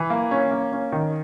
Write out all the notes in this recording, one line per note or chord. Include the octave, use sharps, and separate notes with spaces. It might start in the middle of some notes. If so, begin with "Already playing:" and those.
Already playing: E3
A#3
C#4
A#3
C#4
D#3